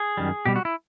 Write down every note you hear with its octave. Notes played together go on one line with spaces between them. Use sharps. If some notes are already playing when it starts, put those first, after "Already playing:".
Already playing: G#4
F#2 D#3 G3
B2 G3 G4
F#4
E4